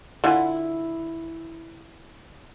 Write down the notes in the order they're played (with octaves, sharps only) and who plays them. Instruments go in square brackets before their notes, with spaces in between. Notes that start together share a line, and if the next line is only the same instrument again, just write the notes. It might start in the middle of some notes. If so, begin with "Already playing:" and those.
[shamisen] D3 F4 G#5 [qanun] E4